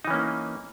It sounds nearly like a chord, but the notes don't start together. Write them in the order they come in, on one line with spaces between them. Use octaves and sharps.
D#4 E3 C#4 A#3